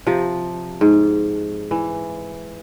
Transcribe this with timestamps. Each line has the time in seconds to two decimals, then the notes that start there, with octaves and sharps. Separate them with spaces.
0.07 C3 F3
0.81 G#2
1.71 E3